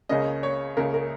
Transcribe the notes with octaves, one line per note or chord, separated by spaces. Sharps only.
C#2 C#3 A#3 C#4 D#5
C#5
C#2 C#3 A#3 C#4 A#4
A#4